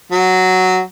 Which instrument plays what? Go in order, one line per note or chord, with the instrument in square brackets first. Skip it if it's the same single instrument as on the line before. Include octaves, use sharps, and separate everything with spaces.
[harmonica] F#3